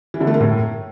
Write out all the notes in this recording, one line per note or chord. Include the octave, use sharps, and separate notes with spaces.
E3
D3
A3
A#3
A2